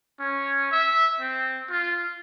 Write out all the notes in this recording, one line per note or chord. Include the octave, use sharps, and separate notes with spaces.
C#4
E5
C4
F4